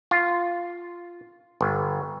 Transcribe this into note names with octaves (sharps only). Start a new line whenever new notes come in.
F4
G1